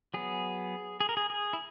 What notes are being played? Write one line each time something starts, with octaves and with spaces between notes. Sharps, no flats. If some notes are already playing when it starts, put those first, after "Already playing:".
F#3 B3 G#4
G#4
A#4
G#4
G#4
E4